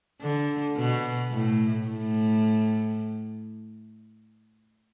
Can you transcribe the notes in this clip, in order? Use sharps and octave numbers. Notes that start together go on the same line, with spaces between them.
D3
B2
A2
A2